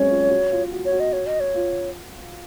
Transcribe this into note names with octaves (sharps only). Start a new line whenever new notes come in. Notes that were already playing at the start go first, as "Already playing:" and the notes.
Already playing: F#3 G#3 C4 C#4 C#5
F4
F#4
F4
F#4
C#5
F#4
D#5
C#5
D#5
C#5
F4